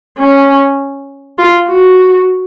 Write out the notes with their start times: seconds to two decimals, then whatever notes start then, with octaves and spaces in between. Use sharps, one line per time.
0.18 C#4
1.38 F4
1.68 F#4